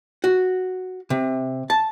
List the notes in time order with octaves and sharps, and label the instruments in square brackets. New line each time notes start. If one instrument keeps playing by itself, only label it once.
[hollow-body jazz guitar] F#4
C3
A5